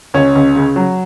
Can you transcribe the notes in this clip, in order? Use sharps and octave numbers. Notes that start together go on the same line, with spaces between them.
C#2 C#4
C#2
C#3
F#3